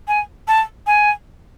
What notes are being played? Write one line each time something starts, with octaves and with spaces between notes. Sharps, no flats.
G#5
A5
G#5